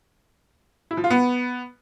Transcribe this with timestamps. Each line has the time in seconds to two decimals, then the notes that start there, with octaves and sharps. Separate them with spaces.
0.91 E4
0.97 F3
1.04 F4
1.10 B3